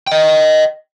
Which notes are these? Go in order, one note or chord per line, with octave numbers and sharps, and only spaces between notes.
D#5 G5